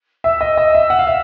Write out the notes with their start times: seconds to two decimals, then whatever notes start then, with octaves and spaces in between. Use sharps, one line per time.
0.24 E5 E6
0.41 D#5
0.57 D#5
0.75 E5
0.90 F#5
0.99 F5
1.07 E5